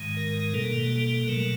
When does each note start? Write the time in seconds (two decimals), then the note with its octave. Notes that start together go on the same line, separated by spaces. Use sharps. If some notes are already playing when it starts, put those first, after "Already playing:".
Already playing: G#2 D#3 G#3
0.17 A#4
0.54 B2 G3 A#3 A4
0.91 A4
1.28 B2 F#3 A3 A#4